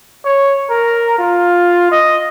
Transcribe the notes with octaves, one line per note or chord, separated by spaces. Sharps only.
C#5
A#4
F4
D#5